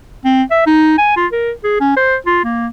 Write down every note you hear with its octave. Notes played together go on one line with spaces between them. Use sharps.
C4
E5
D#4
G#5
F4
A#4
G#4
C#4
C5
F4
A#3